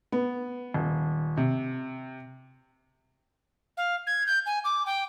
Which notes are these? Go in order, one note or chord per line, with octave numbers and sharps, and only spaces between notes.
B3
D#1
C3
F5
G#6
G6
G#5
D6
G5